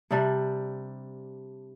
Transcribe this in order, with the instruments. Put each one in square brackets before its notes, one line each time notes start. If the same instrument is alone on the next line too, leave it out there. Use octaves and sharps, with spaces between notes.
[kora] C3 G3 D4